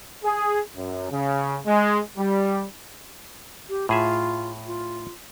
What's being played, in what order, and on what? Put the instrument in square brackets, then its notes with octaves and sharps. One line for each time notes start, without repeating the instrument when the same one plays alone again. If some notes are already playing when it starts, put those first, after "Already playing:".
[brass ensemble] G#4
F#2
C#3
G#3
G3
[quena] G4
[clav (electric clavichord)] A2 G#4 E5 [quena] F4
[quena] F4